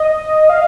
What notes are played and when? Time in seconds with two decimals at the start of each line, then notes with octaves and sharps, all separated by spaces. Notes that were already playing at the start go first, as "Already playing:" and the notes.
Already playing: D#5
0.49 F5